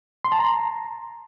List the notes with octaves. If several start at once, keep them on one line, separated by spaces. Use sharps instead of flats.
C6
A5
A#5